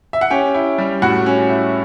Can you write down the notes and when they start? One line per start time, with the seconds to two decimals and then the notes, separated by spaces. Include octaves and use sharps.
0.13 E5
0.21 F#5
0.30 C#4 G4 G5
0.54 E4
0.78 G3
1.02 A2 F#4 F#5
1.26 C#4
1.50 E4